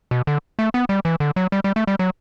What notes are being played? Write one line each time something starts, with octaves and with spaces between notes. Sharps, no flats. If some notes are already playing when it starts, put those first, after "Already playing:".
B2
D3
A3
B3
G3
E3
D3
F#3
G3
G3
A3
G3
F#3